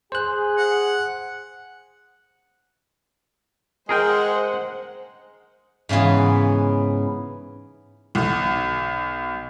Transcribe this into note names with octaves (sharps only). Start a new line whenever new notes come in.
G#4 C5 F#6
F#5
G#3 G#4 A#4 C5 F#5 G5
G#2 C#3 E3 B3 G#4
B1